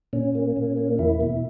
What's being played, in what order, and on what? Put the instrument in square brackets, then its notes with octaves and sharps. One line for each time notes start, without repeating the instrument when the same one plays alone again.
[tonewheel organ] A#2 C#4
A#3
A#2
A#3
E2 E4
B2